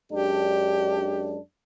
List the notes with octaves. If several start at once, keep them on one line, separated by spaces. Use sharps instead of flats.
F#2 G#3 D4 G4